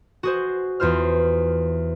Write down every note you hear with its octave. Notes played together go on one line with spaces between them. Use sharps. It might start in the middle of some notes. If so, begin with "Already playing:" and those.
F#4 G#4 C5
E2 F4 C5 F6